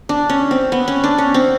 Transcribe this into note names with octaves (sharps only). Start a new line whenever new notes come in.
D4
C#4
C4
B3
C#4
D4
C#4
C4